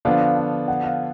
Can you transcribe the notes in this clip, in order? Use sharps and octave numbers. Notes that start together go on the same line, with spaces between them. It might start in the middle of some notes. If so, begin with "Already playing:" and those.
D3 F3 B3 D4 F4 F5
F5
F5
F#5
F5